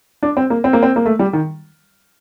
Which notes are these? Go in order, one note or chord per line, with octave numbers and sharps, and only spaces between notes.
D4
C4
A#3
C4
A#3
C4
A#3
A3
G3
D#3